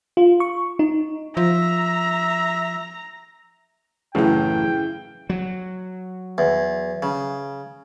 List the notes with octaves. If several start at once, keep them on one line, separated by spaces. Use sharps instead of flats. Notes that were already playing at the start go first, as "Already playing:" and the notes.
F4
C#6
D#4
F3 E5 A#5
A1 F#2 A2 C#3 E3 G5
F#3
E2
C#3